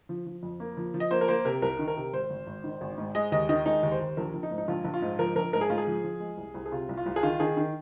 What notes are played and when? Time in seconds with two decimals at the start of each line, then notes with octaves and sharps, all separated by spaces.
0.09 F3
0.26 F3
0.43 F2
0.60 A#3
0.77 F3
0.94 F3
1.00 D#5
1.11 A#3 C5
1.21 A#4
1.28 A#3 C5
1.45 C3 A#4
1.62 C2 A#4
1.79 D#3
1.88 A#4
1.97 C3
2.13 G#1 C5
2.30 G#1
2.47 G#1
2.64 D#3
2.81 G#1
2.98 G#2
3.15 G#3 D#5
3.32 D#2 D#5
3.49 D#3 D#5
3.66 G#3 D#4
3.83 D#2
3.91 C5
4.00 D#2
4.17 A#1 A#4
4.34 A#1
4.43 D#4
4.51 G#2
4.58 D#4
4.68 A#1 F4
4.85 A#1
4.94 F4
5.02 G#2
5.19 F3 A#4
5.36 A#1 A#4
5.53 G#2 A#4
5.61 G#4
5.70 G#2 F4
5.78 G#4
5.87 F3
6.04 F3
6.20 G#3
6.38 C2
6.54 C2
6.66 G#4
6.72 C3 F4
6.89 C2
6.97 F4
7.06 C2
7.16 G#4
7.23 D#3 F4
7.40 D#3 G#4
7.57 D#3